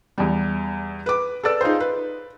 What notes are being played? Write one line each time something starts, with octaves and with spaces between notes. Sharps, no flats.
E2 G3
B4 D6
A4 B4 D5 E6
D#4 F4 G#4 C5
B4